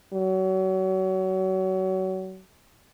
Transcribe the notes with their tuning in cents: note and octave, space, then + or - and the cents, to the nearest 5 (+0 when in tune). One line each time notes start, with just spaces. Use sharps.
F#3 +30